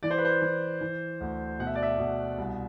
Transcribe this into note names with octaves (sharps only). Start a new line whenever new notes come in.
E3 D5
C5
B4
C5
E3
E3
D2
B2 F#5
E5
D5
E5
B2
C2